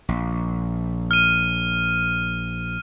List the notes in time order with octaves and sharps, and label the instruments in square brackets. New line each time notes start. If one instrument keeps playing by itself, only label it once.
[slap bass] A#1
[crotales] F6 D#7